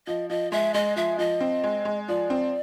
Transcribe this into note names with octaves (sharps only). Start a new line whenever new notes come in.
F3 D#5
F3 D#5
G#3 E5
G#3 D#5
F3 E5
F3 D#5
C4
G#3
G#3
F3 D5
C4